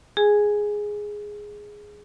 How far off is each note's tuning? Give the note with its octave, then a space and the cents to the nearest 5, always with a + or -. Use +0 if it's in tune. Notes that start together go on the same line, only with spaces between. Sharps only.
G#4 +0 G#5 -5